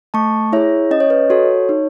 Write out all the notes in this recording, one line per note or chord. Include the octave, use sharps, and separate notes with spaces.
A3 A5 C#6
E4 G#4 C#5 E5
C#4 D#5
C#5
B4 D#5
F#4 A4 C#5
D#4